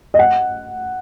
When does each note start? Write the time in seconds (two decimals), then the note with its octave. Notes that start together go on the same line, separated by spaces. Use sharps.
0.14 D#5
0.19 F#5